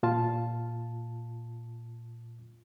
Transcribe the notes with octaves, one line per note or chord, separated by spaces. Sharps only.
A#2 F4 A5